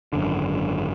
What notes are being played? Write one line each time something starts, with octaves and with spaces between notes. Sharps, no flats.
G#1 F#2 D3